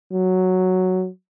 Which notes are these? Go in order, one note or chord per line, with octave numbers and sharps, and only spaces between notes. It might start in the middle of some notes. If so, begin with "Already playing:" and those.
F#3